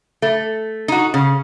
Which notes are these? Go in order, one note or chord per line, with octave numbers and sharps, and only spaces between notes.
A3
D#4 F#4
C#3